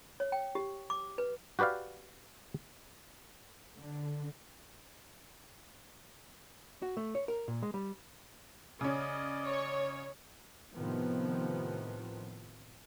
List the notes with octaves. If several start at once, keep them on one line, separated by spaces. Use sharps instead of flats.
C#5
G5
G4
D6
B4
F#4 G4 B4 D5 F5
D3
F#4
A3
C#5
A#4
A#2
G#3
G3
C#3 C#4 D5 D#5
C#5
A2 C3 D#3 F3 B3